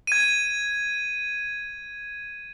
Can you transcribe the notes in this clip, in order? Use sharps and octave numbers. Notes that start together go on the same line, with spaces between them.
G#6 D#7